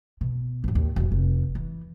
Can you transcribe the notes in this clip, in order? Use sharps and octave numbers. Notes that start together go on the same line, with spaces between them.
B2
A1 F2
D#2
E1 G2
F1
E3